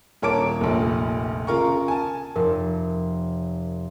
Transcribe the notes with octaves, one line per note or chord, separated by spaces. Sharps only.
D#1 A#4 C#5 A5 D6 D7
F1 A#1
C#3 F4 A#4 C#6
G#5 A5
F1 A#4